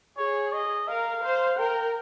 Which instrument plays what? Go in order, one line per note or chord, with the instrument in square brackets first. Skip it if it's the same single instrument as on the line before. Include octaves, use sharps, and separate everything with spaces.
[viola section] G#4 [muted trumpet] C#5
[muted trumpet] D#5
[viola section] A#4 [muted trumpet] F5
[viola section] C5
[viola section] A#4 [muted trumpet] G5